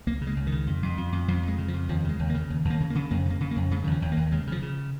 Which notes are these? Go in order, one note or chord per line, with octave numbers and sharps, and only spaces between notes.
C#2 A#3
C#3
G#3
C#2
D#3
C#3
F2
F2
F2
F2
F2 F3
F2 G#3
C#3
F3
F2
D#2 F3
C#3 G#3
D#2
A#3
C#3
D#2
D#2
A#3
C#3
A#3
C#3
F2 A#3
C#3 A#3
C#3
A#3
F2
C#3 G#3
D#3
D#2 F3
D#2
A#3
D#2
C#3 G#3
C#3 F3
C#3